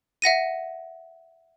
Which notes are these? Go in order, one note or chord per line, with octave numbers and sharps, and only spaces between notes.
E5 F#5 A#6 D#7